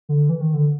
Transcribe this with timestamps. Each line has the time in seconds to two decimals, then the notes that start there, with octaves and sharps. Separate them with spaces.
0.09 D3
0.29 E3
0.41 D#3
0.54 D3